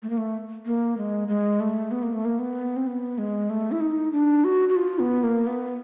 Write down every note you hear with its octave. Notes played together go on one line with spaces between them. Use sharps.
A3
A#3
A3
A#3
G#3
G#3
A3
B3
A#3
A3
A#3
B3
C4
B3
G#3
A3
E4
D#4
D4
F#4
F#4
F4
B3
A#3
B3